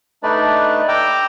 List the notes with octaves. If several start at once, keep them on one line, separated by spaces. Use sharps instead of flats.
A3 D4 D#4 B4 D5
G5 A#5 D6 E6